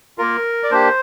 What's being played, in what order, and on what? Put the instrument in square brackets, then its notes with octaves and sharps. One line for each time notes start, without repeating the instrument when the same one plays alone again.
[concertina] A#3 F4 A#4
D5
A#3 D4 G4 C5